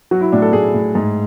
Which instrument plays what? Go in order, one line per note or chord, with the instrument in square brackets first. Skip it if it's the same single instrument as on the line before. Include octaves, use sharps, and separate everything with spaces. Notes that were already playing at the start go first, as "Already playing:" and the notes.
[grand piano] F#3 F#4
E4
A2 D4
A4
A2 G#4
A2
G#2